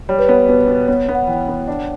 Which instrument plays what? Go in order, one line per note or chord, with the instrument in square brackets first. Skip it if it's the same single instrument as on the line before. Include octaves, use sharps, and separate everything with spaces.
[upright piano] G3 [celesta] C#5
[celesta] B4
[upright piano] B3 [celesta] C#5
[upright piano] B2 [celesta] B4
[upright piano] B2
[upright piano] B3 [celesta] C#5
[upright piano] B3
[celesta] F#5
[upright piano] E3 [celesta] G5
[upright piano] B3
D4